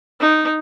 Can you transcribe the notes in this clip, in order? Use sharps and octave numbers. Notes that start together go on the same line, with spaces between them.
D#4